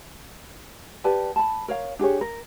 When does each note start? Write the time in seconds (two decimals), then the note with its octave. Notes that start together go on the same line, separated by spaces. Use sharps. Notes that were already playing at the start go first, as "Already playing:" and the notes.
1.04 G4 B4 D5 A5
1.36 A5 B5
1.68 A#4 C#5 F5
1.99 D4 G4 G#4 C#5
2.21 A#4